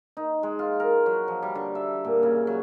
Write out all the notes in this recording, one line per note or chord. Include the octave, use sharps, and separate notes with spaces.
D#4
G#3
F4
A#4
F#3
F3
G3
D3
E5
A#2
C#3
F#3